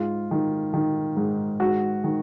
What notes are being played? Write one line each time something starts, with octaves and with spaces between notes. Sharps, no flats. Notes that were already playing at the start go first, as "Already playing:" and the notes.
Already playing: G#2 F4
D#3
D#3
G#2
G#2 F#4
D#3